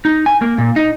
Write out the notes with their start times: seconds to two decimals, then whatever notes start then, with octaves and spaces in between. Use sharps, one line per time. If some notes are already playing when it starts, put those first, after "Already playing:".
0.05 D#4
0.26 G#5
0.42 A#3
0.58 A#2
0.76 D#4